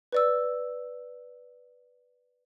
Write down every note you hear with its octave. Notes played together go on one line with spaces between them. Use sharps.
B4 D5 E6